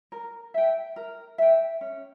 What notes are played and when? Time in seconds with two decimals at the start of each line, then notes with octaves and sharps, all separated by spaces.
0.12 A#4
0.54 E5 G5
0.96 A#4
1.38 E5 G5
1.81 C#4